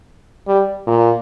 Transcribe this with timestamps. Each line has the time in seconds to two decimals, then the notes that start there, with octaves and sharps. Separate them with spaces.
0.48 G3
0.87 A#2